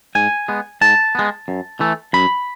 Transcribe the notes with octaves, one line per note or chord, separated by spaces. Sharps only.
G#2 G#5
G#3 B3
G#2 A5
G#3 B3
F#2
E3 A3
F#2 B5